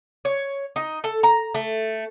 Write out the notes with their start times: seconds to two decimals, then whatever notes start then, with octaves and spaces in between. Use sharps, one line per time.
0.25 C#5
0.76 D#4
1.04 A4
1.23 A#5
1.55 A3